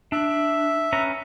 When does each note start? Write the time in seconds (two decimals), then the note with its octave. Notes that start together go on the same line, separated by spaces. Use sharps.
0.12 D4 E5
0.93 C#4 B4 A#5